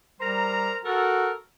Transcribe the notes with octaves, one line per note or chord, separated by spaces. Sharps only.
G3 A#4 C5 A#5
F#4 A4 A#4